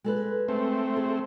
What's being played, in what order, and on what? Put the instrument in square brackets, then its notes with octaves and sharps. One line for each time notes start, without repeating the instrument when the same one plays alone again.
[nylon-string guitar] G#3 A4 B4
[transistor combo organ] A3 C4
[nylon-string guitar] G#4